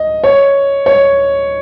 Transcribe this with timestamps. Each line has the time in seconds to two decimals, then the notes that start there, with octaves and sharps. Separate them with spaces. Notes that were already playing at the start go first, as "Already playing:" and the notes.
Already playing: D#5
0.24 C#5
0.86 C#5